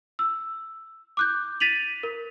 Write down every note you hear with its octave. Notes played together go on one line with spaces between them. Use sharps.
E6
D6 F#6 G6
A6 B6 D#7 F7 F#7
A#4